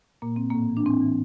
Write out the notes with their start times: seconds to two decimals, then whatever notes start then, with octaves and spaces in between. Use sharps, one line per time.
0.22 A#2 A#3
0.36 A#2 C4
0.50 A2 A#3
0.70 E3
0.77 D4
0.86 A2 C4
1.02 E3